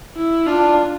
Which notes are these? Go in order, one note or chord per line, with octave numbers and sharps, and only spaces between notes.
E4
D4 F4